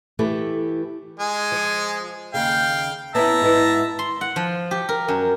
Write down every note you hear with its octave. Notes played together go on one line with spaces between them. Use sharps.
E3 A3 E4 G4 A4 B4
G#3 G#5
F3
D#2 C#3 F5 G5
B3 C#4 E4 E5 A5 A#5
G#2 B3 E4
C6
F#5
F3
G4
A#4
F#2